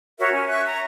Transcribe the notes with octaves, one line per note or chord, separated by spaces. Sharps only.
F#4 A#4 C#5 E5
C#4
E5 C#6 F#6
A#5